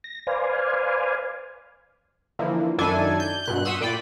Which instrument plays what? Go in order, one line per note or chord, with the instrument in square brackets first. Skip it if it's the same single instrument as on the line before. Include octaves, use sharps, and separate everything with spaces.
[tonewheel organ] A#6
B4 C5 D5 F5 G#5
[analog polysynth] D3 E3 F3 A#3
F#2 D#3 D4 E4 A4 G#5
G6
G2 B2 F#6
E5 F#5 C6 C#6 D#6 E6
A#2 D5 G5 B5